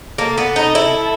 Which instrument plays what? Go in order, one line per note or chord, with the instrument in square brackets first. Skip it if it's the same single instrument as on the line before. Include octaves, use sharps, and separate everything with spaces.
[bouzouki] A#3 [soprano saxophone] A4
[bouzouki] B3
D#4
E4